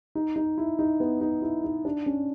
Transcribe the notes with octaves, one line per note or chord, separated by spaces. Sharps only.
D#4
D#4
E4
D#4
B3
D#4
E4
D#4
D4
C#4